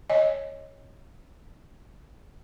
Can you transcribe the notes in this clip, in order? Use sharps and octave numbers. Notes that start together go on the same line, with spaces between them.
C#5 D#5 G#5